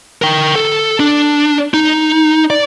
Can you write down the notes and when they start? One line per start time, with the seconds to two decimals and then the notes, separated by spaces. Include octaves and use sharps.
0.22 A#4 G5
0.56 A4
1.00 D4
1.74 D#4
2.50 D5